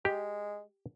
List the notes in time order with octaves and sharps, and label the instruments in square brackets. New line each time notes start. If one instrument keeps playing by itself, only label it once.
[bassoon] G#3 [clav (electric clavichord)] G4